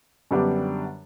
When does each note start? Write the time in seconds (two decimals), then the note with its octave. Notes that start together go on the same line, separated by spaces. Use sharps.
0.31 F#2 D3 G3 B3 D4